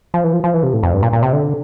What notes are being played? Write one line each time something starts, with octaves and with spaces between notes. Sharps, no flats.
F3
E3
F3
F3
E3
C3
A2
F2
G2
A#2
A#2
C3
D3